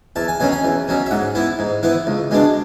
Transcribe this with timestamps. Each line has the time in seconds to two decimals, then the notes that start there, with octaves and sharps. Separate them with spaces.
0.16 E2 A5
0.28 G#5
0.40 B2 F#3 C#4 G#5
0.52 G#5
0.64 E2
0.88 B2 F#3 C#4
1.06 E5
1.11 G#2 F#5
1.35 E3 B3 E4
1.59 G#2
1.83 E3 B3 E4
2.07 C#2
2.31 B2 G#3 B3 D4